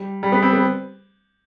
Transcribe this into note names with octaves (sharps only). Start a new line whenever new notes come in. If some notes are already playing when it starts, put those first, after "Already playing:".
Already playing: G3
G3
B3
C4
B3